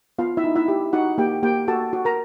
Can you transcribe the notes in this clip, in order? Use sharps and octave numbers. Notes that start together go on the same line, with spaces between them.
B3 F4 F5
E4 E5
D#4
E4 E5
G4
D#4 F#4 F#5
A#3 G4 G5
A#3 G4 G5
F#4 A4 A5
F#4
A#4 A#5